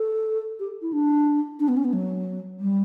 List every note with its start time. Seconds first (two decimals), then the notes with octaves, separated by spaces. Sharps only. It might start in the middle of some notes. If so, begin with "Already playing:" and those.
Already playing: A4
0.60 G4
0.82 E4
0.93 D4
1.60 D4
1.68 B3
1.77 C#4
1.84 B3
1.93 F#3
2.60 G3